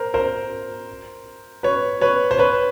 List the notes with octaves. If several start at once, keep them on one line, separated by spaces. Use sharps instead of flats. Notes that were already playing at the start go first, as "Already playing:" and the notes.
Already playing: A#4 C5
A#4 C5
B4 C#5
B4 C#5
C5
B4 C#5